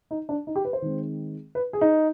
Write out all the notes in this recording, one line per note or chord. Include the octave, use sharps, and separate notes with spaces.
D#4
D4
D#4
G4
B4
C5
D#3 G#3 C4
B4
G#4
D#4